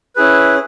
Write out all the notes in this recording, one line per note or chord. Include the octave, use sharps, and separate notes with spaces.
C#4 E4 G#4 B4